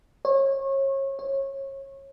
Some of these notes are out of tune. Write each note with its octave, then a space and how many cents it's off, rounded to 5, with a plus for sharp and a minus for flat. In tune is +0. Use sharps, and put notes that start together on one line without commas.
C#5 -30
C#5 -25